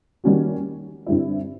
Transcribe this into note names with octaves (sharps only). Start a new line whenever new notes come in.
D#3 G3 A#3 C#4 F#4
G2 D3 G3 C4 E4